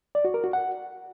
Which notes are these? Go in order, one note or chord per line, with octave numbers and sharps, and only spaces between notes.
D5
F#4
A#4
F#4
F#5